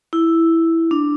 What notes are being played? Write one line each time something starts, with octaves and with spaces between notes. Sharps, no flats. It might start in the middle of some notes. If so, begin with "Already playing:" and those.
E4
D4